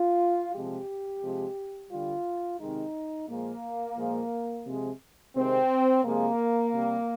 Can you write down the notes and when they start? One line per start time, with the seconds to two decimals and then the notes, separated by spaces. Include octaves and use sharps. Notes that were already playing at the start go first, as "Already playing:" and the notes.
Already playing: F4
0.53 C3 F3 G#3 G4
1.22 C3 F3 G#3
1.90 D3 G3 F4
2.60 C3 D#3 G#3 D#4
3.28 A#2 F3 G#3 A#3
3.97 A#2 F3 G#3
4.66 C3 F3 G#3
5.35 C3 D#3 G#3 C4
6.04 C3 F3 G#3 A#3
6.73 C3 G3